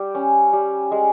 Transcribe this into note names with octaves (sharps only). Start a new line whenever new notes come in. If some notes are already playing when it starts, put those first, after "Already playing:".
Already playing: G3 G5
C#4
G3
G#3